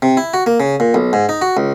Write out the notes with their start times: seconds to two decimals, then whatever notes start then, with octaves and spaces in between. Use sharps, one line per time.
0.02 C3
0.17 E4
0.34 F#4
0.46 A#3
0.60 C#3
0.80 A#2
0.94 B1
1.13 G#2
1.29 D#4
1.42 F#4
1.57 C#2